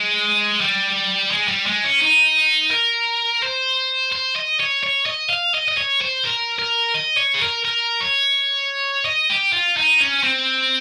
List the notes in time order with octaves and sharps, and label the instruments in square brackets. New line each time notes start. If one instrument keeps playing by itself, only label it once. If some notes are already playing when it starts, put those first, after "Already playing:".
Already playing: [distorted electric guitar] G#3
G3
G#3
G3
G#3
C#4
D#4
A#4
C5
C5
D#5
C#5
C#5
D#5
F5
D#5
D#5
C#5
C5
A#4
A#4
D#5
C#5
G#4
A#4
A#4
C#5
D#5
G4
F4
D#4
C#4
C4